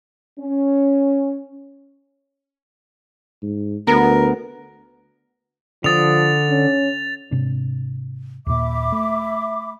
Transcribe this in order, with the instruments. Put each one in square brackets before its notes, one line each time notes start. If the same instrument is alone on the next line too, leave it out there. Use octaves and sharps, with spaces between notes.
[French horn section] C#4
[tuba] G#2
[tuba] D2 [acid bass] B3 [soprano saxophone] A#4
[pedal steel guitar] D3 D#6 [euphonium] F3 [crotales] A6 F7
[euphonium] C#4
[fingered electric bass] G#2 C3 D4
[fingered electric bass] D#2 A#2 [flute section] E5 B5 D6
[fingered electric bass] A3